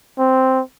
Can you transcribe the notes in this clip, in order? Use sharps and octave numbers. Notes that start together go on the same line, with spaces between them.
C4